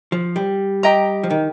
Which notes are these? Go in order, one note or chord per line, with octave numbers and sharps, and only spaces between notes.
F3
G3
G4 D#5 G5 A#5
F3
D#3